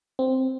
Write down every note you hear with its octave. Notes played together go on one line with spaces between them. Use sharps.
C4